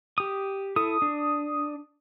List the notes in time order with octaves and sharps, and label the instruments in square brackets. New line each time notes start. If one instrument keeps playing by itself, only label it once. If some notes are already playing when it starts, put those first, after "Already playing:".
[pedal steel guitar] G4 D#6
[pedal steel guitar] E4 A4 [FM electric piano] D#6
[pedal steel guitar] D4